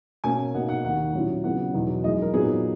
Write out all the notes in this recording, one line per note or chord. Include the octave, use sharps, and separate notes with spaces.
B2 A#3 C#4 G#5
B2 A#3 D#4 F#5
F#5
D#2 D#3 A#3 F#5
A#2 F#3 C#4 E4
C#3 F#3 B3 E4 F#5
E2 B2 F#3 B3 D#4
F#2 E3 G#3 D#4 D#5
A#4
A#2 F#3 B3 D#4 G#4